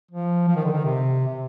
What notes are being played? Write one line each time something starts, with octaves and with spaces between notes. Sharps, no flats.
F3
F3
D#3
D3
D#3
C3
C3